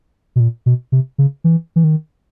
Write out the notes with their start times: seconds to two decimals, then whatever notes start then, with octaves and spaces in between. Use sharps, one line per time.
0.36 B2
0.40 A#2
0.66 B2
0.92 C3
1.18 C#3
1.44 E3
1.76 E3
1.84 D#3